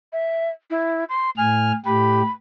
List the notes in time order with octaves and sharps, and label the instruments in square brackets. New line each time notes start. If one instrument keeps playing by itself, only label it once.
[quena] E5
E4
C6
[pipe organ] A2 F6 [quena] G#5
[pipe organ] A2 G4 [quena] B5